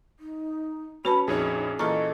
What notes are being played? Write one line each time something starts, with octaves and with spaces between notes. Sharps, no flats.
D#4
C#4 F#4 B4 A5 B5
A#1 F2 D#4 G#4 C#5
A#2 E3 A4 D#5 A#5 C#6 F6